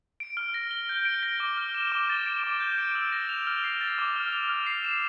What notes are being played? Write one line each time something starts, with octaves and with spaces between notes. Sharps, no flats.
D7
F6
A#6
G7
G6
D7
A#6
D6
F6
E7
D6
A6
D7
D6
G6
D7
E6
A#6
F7
F6
C7
A6
D6
F6
F7
F6
C7
E7